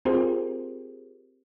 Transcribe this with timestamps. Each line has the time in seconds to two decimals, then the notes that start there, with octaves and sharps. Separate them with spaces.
0.05 C4 F4 G4 G#4 A#4 C5